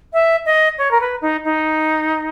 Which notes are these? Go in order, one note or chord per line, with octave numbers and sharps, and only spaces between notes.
E5
D#5
C#5
A#4
B4
D#4
D#4